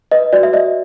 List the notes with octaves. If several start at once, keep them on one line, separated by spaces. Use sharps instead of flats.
B4 D#5
F#4 D5
E5
D5 D#5